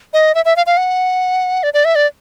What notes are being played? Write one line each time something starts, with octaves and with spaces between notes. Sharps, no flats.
D#5
E5
E5
F5
F5
F#5
D5
D5
E5
D5